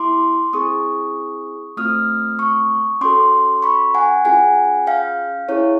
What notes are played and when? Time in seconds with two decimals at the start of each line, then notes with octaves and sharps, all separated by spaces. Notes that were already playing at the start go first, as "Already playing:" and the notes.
Already playing: B3 E4 G4 C6 D6
0.53 C4 E4 G#4 C#6 D#6
1.77 A3 C4 F4 D#6 F6
2.39 C#6 D#6
3.01 C#4 F#4 A4 C6 D6
3.62 B5 C#6
3.94 F#5 G#5
4.25 C#4 F4 G#4 F#5 G#5
4.87 F5 G5
5.49 C#4 E4 G#4 C#5